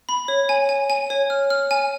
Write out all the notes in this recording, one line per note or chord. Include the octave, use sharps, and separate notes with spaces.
B5
C#5
G#5
G#5
G#5
C#5
F6
F6
G#5